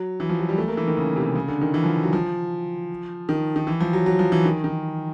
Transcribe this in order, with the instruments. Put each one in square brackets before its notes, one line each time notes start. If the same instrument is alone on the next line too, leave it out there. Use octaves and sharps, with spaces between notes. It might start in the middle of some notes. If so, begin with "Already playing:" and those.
Already playing: [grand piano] F#3
E3
F3
F#3
G3
A3
A#3
E3
D#3
C#3
C3
C#3
D3
D#3
E3
F3
F#3
F3
D#3
D#3
E3
F3
F#3
F#3
F3
E3
D#3
D#3